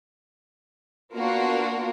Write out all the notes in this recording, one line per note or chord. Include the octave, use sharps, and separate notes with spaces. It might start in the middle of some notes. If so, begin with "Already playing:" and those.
A#3 B3 D4 F4 F#4 A#4